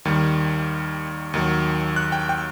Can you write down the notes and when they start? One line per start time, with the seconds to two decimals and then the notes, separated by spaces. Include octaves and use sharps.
0.05 D#2 D#3 G3
1.34 D#2 D#3 F#3
1.96 F#6
2.12 G5
2.29 G5